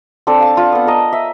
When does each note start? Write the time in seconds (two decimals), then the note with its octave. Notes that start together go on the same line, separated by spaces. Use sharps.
0.27 C4 D4 A4
0.40 F5 A5
0.57 F4
0.72 B3 F#5
0.87 A#4 D#5
1.13 E5